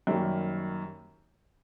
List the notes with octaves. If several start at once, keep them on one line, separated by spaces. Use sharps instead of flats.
F#2 D#3 G3 A#3 C#4